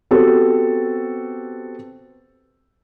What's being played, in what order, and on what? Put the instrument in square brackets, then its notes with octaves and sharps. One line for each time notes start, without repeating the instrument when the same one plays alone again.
[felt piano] B3 C4 F#4 G4 A4 C5